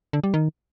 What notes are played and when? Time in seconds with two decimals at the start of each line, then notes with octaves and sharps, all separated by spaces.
0.13 D3
0.24 G3
0.34 D#3